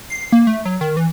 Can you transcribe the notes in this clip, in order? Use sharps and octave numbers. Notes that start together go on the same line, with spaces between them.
C7
A#3
A3
F#3
D#3
E3